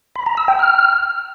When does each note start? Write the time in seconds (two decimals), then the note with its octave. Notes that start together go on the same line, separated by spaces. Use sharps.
0.15 B5
0.26 A#5
0.37 E6
0.48 G5
0.59 F6